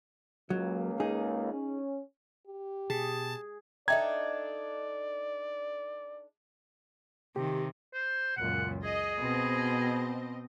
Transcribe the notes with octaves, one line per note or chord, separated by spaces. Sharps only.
C#2 F#3 A#3
D#4 G#4
C#4
G4
B2 G#4 A5
D4 D#4 A4 D5 E5 G5 A#5 G#6
C3 D#3 G4
C5
C#2 F#2 A#2 F#5
G#4 D#5
B2 C4 D#5